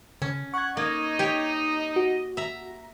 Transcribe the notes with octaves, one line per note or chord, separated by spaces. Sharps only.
C#3 C#4
F#5 C#6 G#6
A#3 D#4 D#5
G4 C#5
F#4
E5 A#5